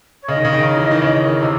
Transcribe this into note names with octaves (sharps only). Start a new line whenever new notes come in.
C#5
C#3 D#5
D#3
C#3
D#3
E3
D#3
C#3
D#3
C3